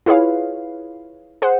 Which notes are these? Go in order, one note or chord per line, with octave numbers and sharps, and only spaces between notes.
E4 F4 G#4 B4 C#5 F5
G#4 C5 F#5